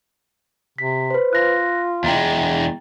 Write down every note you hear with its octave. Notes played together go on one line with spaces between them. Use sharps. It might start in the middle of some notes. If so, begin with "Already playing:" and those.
C3 B6
B4 C5
F4 F#6 A#6
E2 G#3 G5 A#5 A6